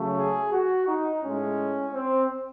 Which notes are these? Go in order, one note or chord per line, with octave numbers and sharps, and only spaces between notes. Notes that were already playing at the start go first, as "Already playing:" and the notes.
Already playing: C#3 F#3 A3
G#4
F#4
D#4
A2 G#3 C#4
C4